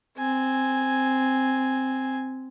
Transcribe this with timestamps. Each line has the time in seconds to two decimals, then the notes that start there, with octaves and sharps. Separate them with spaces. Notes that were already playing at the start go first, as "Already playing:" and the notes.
0.17 C4 G#5